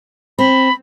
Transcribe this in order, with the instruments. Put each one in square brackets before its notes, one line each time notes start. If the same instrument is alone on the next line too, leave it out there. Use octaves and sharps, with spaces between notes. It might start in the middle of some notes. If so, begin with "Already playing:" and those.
[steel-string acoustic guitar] C4 [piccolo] B5